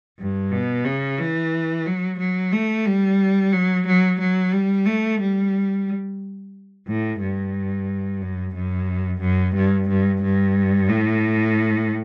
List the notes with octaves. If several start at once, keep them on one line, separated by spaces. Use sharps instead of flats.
G2
B2
C#3
E3
F#3
F#3
A3
G3
F#3
F#3
F#3
G3
A3
G3
A2
G2
F#2
F#2
F#2
G2
G2
G2
A2